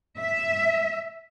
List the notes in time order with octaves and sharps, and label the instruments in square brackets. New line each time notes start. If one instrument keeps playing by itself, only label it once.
[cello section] E5